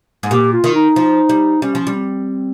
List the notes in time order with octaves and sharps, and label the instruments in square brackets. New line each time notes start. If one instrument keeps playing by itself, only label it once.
[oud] G#2
[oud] A#2 [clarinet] G4
[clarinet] F4
[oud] D#3
[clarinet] D#4
[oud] F3
G3
[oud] G3 [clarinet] C#4
[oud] F3
G3
[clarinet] C4